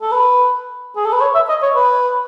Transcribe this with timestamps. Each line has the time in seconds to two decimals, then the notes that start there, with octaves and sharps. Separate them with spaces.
0.02 A4
0.12 B4
0.96 G#4
1.05 A4
1.13 B4
1.21 C#5
1.35 E5
1.49 D#5
1.62 C#5
1.75 B4